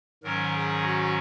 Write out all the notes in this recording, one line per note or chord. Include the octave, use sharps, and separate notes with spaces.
G#2 D#3 F#3 C#4 A#4
G#4
F#4